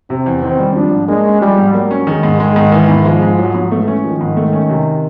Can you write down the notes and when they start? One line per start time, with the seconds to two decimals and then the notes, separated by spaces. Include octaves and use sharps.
0.10 C3 C4
0.26 E2
0.42 D#3 C4
0.59 G3
0.75 F3 D4
0.92 G#2
1.08 G#3 A#3
1.25 C#4
1.41 F3 G3
1.57 G#2
1.74 F#3 A#3
1.91 C#4
2.07 D#3 G#3
2.23 G#2
2.39 D#3 G#3
2.56 G#2
2.72 D#3 E3
2.89 G#2
3.05 F3 G#3
3.22 G#2
3.38 F3 F#3
3.54 G#2
3.71 E3 A3
3.88 C#4
4.04 D#3 F3
4.21 G#2
4.37 A3
4.53 C#4
4.69 C3